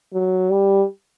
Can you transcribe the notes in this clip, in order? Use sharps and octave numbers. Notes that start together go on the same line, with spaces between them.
F#3
G3